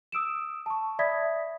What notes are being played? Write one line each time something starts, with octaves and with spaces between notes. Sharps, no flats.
D#6 E6 D7 E7
A5 C#6
D5 E5 B5 D#6 G#6 B6